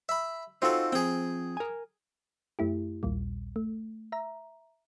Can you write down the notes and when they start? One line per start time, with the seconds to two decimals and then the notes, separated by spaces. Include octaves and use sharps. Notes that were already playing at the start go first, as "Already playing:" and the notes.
0.09 E5 B5
0.62 C4 D#4 F4 F#4 A4
0.93 F3 C4 G#4 G5
1.57 A#4 G#5
2.59 F#2 A3 E4 G4
3.03 A#1 D#2 A#2 G3
3.56 A3
4.12 E5 A#5